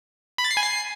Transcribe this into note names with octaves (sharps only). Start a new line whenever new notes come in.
B5
A6
C7
G#5
C7